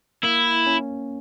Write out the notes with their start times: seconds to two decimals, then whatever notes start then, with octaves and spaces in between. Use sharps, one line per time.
0.23 A#3 E4
0.67 C#4